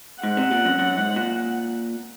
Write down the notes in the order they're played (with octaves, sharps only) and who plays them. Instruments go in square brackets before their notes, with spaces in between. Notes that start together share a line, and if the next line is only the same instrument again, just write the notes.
[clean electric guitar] G#2 [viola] F#5
[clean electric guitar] C3
A#2
F#2
F#2
G#2
A#2